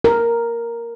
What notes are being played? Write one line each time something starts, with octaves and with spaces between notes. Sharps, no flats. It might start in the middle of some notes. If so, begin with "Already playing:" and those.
A#4